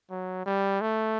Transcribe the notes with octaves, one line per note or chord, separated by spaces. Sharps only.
F#3
G3
A3